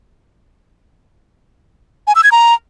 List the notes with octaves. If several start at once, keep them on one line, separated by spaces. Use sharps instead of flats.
G#5
E6
G#6
A#5